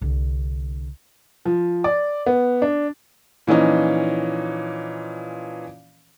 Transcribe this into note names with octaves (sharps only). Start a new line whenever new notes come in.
C2 D3
F3
D5
B3
D4
A#2 E3 F3 C#4 D#4